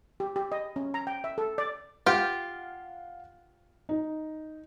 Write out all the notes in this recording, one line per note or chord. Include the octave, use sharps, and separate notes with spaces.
G4
G4
D#5
C#4
A#5
G5
E5
A4
D5
F4 G4 F5 F#5
D#4